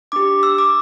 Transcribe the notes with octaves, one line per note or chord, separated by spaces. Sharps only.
D4 G4 D6
E6
D6